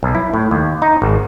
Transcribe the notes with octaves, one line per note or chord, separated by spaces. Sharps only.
B1
E4
A2
D#2
D#4
G#1